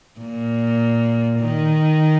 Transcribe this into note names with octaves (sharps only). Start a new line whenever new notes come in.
A#2
D#3